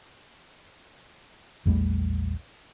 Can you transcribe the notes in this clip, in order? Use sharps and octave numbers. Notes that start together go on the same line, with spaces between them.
A#1 E2 G3 A3